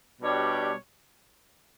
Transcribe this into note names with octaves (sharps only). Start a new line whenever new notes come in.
B2 G3 D4 G4 C#5